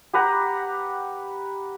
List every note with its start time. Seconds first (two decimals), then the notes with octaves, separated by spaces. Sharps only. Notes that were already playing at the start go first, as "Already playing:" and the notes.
0.13 G4 B4 F#5 A#5